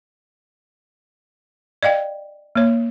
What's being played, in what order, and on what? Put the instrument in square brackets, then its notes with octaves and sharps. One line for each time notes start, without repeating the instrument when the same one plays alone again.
[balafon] D5 D#5 F5 G5
A#3 C#5